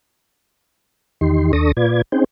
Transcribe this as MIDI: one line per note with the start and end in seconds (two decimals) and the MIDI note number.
1.21 1.52 40
1.21 1.52 51
1.21 1.52 63
1.21 1.52 67
1.21 1.52 84
1.53 1.72 39
1.53 1.72 62
1.53 1.72 69
1.53 1.72 85
1.53 1.72 87
1.53 1.72 94
1.77 2.02 46
1.77 2.02 65
1.77 2.02 71
1.77 2.02 74
1.77 2.02 92
2.12 2.24 60
2.12 2.24 61
2.12 2.24 63
2.12 2.24 68
2.12 2.24 72
2.12 2.24 79